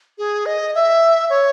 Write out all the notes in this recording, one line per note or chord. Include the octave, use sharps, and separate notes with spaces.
G#4
D#5
E5
C#5